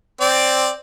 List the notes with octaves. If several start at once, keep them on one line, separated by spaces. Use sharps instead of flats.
C4 D5